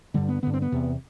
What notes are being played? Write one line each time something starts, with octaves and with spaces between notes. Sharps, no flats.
G2 D3 G3
B3
G2 D3 B3
C4
B3
E2 C3